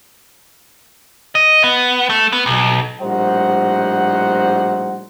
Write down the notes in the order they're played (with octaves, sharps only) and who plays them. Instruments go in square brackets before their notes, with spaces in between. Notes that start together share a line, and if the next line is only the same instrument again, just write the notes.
[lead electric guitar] D#5
B3
A3
B3
B1
[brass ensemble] A#1 A2 G3 D#4 C5 F#5